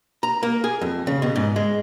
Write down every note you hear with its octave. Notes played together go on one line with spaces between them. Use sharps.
A#5
A#3
G#4
F2
C#3
B2
G#2
G#3